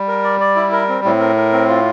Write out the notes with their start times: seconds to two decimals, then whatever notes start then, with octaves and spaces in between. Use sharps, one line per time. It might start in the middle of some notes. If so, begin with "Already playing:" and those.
Already playing: G3
0.08 A#4
0.24 D5
0.40 D5
0.56 E4
0.72 A#4
0.88 C4
1.04 A2 C4
1.20 A#4
1.36 A#4
1.52 C4
1.68 F4